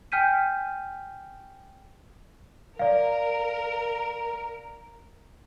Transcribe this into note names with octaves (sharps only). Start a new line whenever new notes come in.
G5 G#5 F6 G6 B6 D#7
A#4 D5 F5